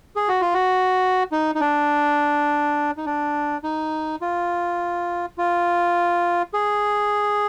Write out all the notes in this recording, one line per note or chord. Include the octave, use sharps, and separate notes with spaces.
G#4
F#4
F4
F#4
D#4
D#4
D4
D#4
D4
D#4
F4
F4
G#4